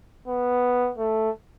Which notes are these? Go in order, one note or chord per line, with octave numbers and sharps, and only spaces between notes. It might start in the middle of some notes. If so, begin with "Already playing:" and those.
B3
A3